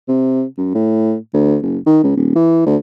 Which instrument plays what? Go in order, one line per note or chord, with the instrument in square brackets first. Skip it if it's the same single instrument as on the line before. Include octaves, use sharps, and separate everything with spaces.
[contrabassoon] C3
F#2
A2
D2
F#1
D#3
C#2
D#1
E3
D2